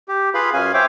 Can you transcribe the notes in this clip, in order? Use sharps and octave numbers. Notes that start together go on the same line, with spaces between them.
G4
F4 G#4 B4 F5 B5
F#2 C#4 F5 G#5
C5 C#5 E5 G5 D6